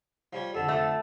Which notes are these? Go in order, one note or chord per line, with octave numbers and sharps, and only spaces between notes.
F3 G3 C#5
F2 D3 A4
A3